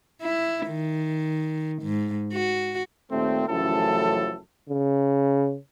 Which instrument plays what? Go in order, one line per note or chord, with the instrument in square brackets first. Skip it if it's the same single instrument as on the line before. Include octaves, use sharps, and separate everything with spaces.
[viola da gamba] E4
D#3
G#2
F#4
[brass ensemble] D#2 A#2 A3 C4
A1 F#2 A2 C#3 F3 A4
[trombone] C#3